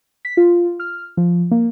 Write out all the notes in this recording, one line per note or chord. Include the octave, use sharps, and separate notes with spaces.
B6
F4
F6
F3
A#3